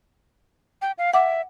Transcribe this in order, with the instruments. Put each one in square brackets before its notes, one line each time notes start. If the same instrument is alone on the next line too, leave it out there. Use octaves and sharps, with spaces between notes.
[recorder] G5
F5
[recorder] E5 [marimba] F#5 D6